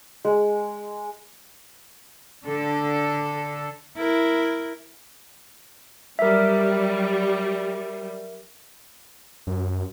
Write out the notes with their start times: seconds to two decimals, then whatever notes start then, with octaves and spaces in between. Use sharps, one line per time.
0.25 G#3
2.45 D3 A4
3.97 E4 A#4
6.19 F#3 G3 A#4 E5
9.47 F#2